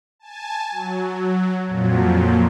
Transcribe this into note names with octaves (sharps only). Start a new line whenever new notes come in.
G#5 A5
F#3
F2 A#2 F3 F#3